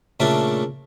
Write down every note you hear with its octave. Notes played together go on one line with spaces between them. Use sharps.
A#2 C#3 A3 D4